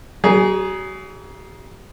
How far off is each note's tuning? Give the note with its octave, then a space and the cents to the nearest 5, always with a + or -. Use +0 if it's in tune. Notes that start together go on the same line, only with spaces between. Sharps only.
F#3 +45 G#4 +0